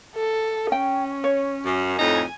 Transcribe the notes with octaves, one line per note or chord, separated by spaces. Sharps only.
A4
C#4 G5
C#5
F#2
F2 A2 D#4 G#5